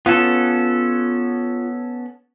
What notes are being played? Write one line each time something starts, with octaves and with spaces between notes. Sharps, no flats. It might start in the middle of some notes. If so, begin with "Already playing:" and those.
B3 C#4 F4 A4